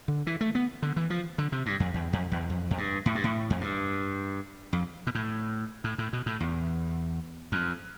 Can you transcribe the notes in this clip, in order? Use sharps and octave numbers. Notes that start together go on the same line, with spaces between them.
D3
E3
A3
B3
D3
E3
F3
D3
C3
G2
F2
E2
F2
E2
F2
F2
G2
A2
G2
A2
F2
G2
F2
B2
A2
A2
A2
B2
A2
E2
F2